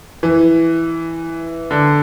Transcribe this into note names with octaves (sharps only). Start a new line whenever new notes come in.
E3
D3